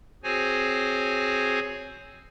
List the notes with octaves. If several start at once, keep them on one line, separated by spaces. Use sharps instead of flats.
C4 F#4 G#4 C5 C#5 G#5